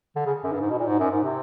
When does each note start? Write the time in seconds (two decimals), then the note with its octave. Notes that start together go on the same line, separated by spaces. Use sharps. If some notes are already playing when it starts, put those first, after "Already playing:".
0.16 D3
0.26 C#3
0.43 F#2
0.52 G2
0.61 G#2
0.70 B2
0.79 A#2
0.87 G#2
0.99 F#2
1.11 G#2
1.23 C3